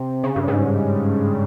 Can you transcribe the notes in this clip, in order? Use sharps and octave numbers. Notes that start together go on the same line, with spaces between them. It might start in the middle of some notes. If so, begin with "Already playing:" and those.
Already playing: C3
C#3
G2
G#2